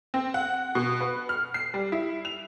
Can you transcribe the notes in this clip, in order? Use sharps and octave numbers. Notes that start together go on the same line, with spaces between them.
C4
F#5
B2
B4
F6
C7
G3
E4
F7